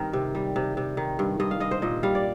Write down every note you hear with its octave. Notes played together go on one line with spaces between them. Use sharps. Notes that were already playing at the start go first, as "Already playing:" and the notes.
Already playing: G2 D#3 C4 A#4
C3
G3
C3
C3
D#3
G2
G2 D#5
F5
G2 D#5
C5
A#2 D#5
G3 F5
D5